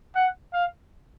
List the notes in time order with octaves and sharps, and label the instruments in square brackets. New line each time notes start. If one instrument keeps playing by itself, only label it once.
[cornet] F#5
F5